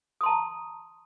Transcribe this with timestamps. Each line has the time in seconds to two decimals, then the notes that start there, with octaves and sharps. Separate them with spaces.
0.21 D#6
0.23 C6
0.26 A5
0.29 A#5